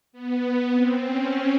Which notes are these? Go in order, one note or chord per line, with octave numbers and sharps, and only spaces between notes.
B3
C4
C#4